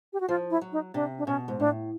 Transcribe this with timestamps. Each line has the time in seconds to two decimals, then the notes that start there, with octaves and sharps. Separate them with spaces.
0.13 G4
0.20 F#4
0.28 F3 F4
0.50 E4
0.61 F#3
0.72 D#4
0.94 C3 D4
1.18 D4
1.27 B2 C#4
1.48 G#2
1.59 A2 D4